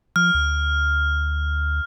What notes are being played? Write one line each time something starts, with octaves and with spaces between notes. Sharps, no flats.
F3 F6
D2